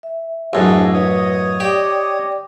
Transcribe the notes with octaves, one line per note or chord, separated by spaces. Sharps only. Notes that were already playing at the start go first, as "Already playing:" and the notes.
E5
A1 F#2 D4 E4 G#4 A4 C5 D#5
B4 C#5 D#5 D#6
G4 D5 G5 D6